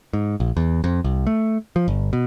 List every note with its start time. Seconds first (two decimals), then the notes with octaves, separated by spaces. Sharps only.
0.13 G#2
0.40 A#1
0.57 E2
0.84 F2
1.04 C2
1.27 A3
1.76 F3
1.88 G1
2.13 B2